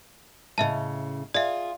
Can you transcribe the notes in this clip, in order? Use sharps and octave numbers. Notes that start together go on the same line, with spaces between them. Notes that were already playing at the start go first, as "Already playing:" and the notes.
A2 C#3 D#5 E5 A5
F4 G#4 D5 E5